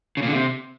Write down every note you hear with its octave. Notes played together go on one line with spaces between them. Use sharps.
C#3
A#2
D3
C3